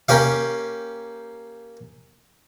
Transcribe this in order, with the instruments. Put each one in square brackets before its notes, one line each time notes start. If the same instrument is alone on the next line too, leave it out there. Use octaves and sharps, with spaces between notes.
[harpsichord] A#3 C#4 G4 F5